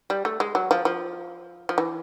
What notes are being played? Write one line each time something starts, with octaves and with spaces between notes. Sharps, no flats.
G3
A3
G#3
F#3
F3
F3
F3
E3